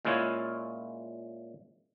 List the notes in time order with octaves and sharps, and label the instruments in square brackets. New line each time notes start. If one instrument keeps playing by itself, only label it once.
[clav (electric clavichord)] A#2 G#3 C#4 E4 F4 C#5